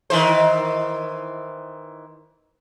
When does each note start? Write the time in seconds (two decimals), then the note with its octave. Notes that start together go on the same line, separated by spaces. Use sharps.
0.10 D#3 E3 C5